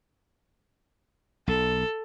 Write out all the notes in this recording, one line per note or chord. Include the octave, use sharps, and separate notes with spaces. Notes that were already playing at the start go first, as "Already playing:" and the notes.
B1 A4